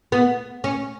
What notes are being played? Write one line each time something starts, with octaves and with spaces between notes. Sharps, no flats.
B3
C#4